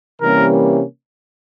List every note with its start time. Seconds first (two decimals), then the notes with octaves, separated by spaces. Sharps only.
0.20 C3 E3 G3 A#3 C#4 A#4